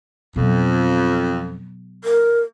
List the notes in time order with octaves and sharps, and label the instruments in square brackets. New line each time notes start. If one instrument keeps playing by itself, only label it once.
[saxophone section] F2 [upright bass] B2 F#3
[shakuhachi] A#4